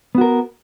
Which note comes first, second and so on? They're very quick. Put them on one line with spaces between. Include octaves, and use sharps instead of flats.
B3 F#4 A#4